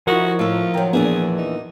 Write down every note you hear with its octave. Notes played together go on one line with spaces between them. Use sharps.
F3 E4 F#4 A#4 C#5 D#5
A2 F4 A4
D#3 F#3 A#4 G5 A#5
E2 A#2 E3 B3 D4 G#4
D#4